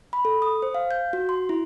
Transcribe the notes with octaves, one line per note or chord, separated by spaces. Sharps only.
B5
A4
D#6
C5
F5
G6
F#4
C6
E4